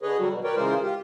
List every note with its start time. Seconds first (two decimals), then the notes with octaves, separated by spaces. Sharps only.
0.02 D3 G#4 B4 C#5 D#5
0.19 D3 F#3 G3 F#4
0.31 B2
0.44 A#4 B4 C#5 D5 G5
0.56 C#3 E3 G#3 F4 A#4 C5
0.82 F4 G4